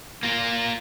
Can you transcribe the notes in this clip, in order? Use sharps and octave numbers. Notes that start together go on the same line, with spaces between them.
A#3 F4